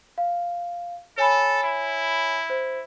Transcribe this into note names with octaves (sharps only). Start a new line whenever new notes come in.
F5
A4 C#5 G#5 B5
E4
C5